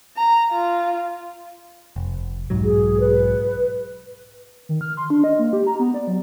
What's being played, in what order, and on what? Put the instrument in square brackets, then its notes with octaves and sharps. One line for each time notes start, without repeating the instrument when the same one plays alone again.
[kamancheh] A#5
F4
[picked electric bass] F1
B1 G#2 F#3
[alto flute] G#4
B4
[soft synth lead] D#3
F6
C6
D4
D#5
A#3
G4
A#5
B3
D5
F#3